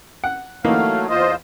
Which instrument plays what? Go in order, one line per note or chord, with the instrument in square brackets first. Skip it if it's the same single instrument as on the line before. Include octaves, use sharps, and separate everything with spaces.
[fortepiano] F#5
[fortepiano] E3 A#3 D#4 [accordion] F#3 A3 [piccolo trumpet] F5
[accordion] E2 F4 C5 [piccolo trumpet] D#5